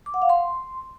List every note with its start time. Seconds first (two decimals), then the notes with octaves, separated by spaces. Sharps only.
0.06 D6
0.14 F#5
0.22 F5
0.29 C6